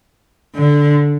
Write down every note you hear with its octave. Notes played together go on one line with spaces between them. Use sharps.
D3